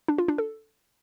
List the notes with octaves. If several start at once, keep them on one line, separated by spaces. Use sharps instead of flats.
D4
F4
D4
A4